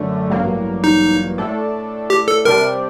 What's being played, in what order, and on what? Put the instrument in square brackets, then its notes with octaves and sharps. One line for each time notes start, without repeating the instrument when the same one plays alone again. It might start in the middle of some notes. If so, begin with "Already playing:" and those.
Already playing: [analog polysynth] F#2 D3 A3
A1 G2 F#3 A#3
[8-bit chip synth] D#4
[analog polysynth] A2 A3 D4 A4
[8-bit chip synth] G4
A4
[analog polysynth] C3 G3 D4 [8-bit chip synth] A#4